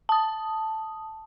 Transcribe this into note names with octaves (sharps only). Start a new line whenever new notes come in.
A5 D#6